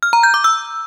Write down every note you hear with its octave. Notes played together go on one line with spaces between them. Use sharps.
F6
A#5
G6
D6
E6